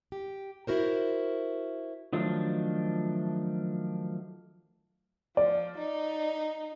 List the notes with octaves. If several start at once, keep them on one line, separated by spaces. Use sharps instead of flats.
G4
E4 F#4 A#4 C5
D#3 F3 F#3 A3 D4
F3 D5
D#4